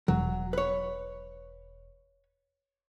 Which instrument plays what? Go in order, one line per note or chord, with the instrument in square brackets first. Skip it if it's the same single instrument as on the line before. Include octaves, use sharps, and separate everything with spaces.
[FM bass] E1 [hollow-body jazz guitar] F#3
[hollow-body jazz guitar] B4 C#5